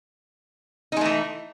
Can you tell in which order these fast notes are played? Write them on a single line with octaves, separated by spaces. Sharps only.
D#4 G#3 A3 E3